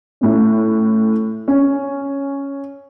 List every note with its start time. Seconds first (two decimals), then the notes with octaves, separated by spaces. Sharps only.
0.21 A2 C#4
1.48 C#4